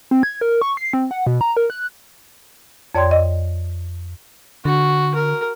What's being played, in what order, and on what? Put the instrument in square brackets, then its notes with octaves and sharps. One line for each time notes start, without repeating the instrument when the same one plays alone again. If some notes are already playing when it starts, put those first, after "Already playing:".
[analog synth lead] C4
G#6
A#4
C#6
C7
C4
F#5
B2
A#5
A#4
F#6
[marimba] F2 C#5 D5 G5 C6 G#6
D#5
[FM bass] D3 [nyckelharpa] F#4
[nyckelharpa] A#4